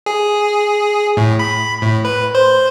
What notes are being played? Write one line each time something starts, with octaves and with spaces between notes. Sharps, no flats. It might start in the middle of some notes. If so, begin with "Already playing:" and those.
G#4
A2
B5
A2
B4
C5